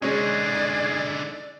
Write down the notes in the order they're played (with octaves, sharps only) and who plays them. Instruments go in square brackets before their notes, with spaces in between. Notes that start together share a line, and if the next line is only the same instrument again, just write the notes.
[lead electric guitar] D3 D#4 [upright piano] G#3 C#4 [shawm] G#4 [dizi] D5